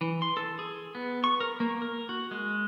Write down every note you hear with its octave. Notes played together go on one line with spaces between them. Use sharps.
E3
C6
A4
G#4
B3
C#6
A#4
A#3
A#4
F#4
G#3